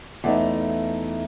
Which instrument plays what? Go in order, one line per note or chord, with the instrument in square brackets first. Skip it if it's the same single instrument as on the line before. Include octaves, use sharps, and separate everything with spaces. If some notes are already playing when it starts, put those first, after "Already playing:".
[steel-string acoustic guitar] E2 A3 D#4